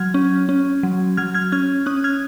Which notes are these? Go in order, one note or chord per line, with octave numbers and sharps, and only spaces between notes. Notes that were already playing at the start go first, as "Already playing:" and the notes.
Already playing: F#3 F6 G#6
C#4
C#4
F#3
F#3 F6 G#6
F6 G#6
C#4 F6 G#6
C#4 D#6 F#6
F6 G#6